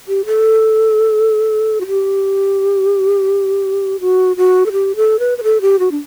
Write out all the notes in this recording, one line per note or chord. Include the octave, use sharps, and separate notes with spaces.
G4
A4
F#4
G4
F#4
F#4
A4
G4
A4
B4
B4
A4
G4
F#4
D4